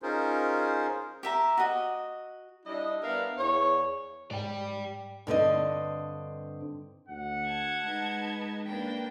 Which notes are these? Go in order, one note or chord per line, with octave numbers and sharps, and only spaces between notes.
C#4 D#4 F4 G#4 A#4 C5
G4 E5 A#5
F#4 D#5
G3 D4 E4 D#5
B3 D4 A#4 E5 F5
E2 C#5
G#2 D5 G5
G2 D3 C4 D#5
D2 F#5
A5 G#6
G#3 D#4 B4
A#3 D4 B4 G5